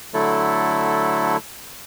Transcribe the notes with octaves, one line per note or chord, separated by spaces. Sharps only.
D3 F#3 A3 E4 A4